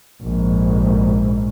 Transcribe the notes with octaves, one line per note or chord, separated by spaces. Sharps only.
A#1 G#2